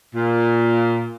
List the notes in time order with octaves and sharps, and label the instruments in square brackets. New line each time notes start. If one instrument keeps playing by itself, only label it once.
[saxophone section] A#2